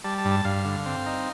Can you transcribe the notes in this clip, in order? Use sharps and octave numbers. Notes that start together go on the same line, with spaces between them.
G3 A5
A5
G2
A5
G2 F5
D3
C4
D#4